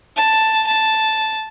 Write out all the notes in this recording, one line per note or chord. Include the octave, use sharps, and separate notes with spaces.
A5
A5